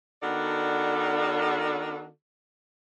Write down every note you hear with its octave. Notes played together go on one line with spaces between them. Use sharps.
D#3 B3 D4 F#4 A4 D5